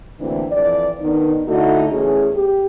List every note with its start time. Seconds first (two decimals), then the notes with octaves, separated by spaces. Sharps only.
0.20 D2 A#2 E3 C4 D4
0.51 F2 E3 D5
1.01 D#3 B3 D4 D#4
1.47 D3 A3 D#4 E4 F#4
1.91 E2 A3 C#4 G#4
2.34 G4